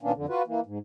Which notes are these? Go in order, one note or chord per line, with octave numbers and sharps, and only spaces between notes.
A#2 D#3 A#3 B3 C#4 D4
F2 D3
F4 F#4 B4
E3 A#3
G#2